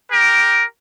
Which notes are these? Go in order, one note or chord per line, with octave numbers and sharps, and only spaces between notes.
G4 A#4